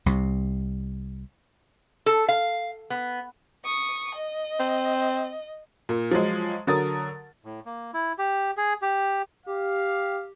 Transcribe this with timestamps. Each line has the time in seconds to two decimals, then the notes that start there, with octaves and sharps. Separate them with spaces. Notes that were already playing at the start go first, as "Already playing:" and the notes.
0.06 C2 C3
2.06 A4
2.28 F5
2.90 B3
3.63 C#6 D#6
4.14 D#5
4.60 C4
5.89 A#2
6.11 F3 F#3 G#3
6.67 D3 F#3 A#4 D#6 A6
7.45 A2
7.66 A#3
7.94 E4
8.18 G4
8.57 G#4
8.82 G4
9.46 G4 F5